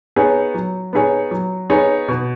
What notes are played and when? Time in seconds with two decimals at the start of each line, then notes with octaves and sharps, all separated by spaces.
0.16 B3 D#4 G#4 C#5
0.54 F#3
0.93 B3 D#4 G#4 C#5
1.31 F#3
1.70 B3 D#4 G#4 C#5
2.08 B2